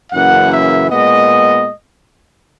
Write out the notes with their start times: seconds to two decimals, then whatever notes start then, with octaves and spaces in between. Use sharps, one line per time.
0.12 F#2 C#3 E3 A#3 F#5
0.52 E5
0.91 A#2 G#3 B3 D#5